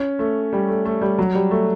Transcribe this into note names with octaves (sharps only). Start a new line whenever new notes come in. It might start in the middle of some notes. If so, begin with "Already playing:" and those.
Already playing: C#4
A3
G3
A3
A3
G3
F#3
G3
A3